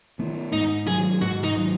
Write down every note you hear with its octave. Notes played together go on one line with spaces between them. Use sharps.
D#3 B3
G#2 D#4
D#3 F#3 G#4
G#2 F#4
D#4
D#3 F#3